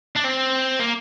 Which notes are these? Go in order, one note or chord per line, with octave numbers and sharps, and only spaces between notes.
D4
C4
A#3